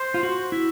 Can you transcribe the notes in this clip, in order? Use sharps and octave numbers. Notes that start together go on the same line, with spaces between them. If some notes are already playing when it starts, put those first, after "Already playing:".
Already playing: C5
F4
F#4
E4